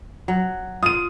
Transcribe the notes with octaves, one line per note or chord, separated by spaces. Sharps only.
F#3
F4 D#6 D#7